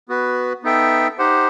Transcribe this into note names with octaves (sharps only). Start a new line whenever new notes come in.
B3 F#4 B4
B3 D#4 A4 E5 G5
D#4 G4 C5 F#5